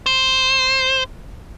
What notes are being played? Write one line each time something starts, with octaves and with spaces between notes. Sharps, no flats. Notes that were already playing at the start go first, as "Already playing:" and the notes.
C5